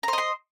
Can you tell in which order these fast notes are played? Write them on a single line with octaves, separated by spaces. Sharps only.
A#5 C5 D#5 C6